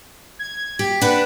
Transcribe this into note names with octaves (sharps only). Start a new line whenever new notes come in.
G#6
G4
D4 G4 B4 F#5